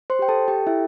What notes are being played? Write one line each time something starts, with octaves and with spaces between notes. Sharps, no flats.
C5 C6
G4 G5
A4 A5
G4 A4 G5
E4 E5